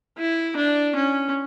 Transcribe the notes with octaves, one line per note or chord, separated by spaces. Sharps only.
E4
D4
C#4